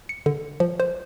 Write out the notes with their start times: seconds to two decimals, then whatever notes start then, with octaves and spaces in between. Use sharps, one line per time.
0.09 C#7
0.26 D3
0.60 F3
0.80 C5